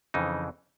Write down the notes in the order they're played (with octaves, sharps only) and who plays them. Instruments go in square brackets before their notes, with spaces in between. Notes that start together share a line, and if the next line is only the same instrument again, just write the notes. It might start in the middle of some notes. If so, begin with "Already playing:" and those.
[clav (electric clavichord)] F2 C#3 E3 D#4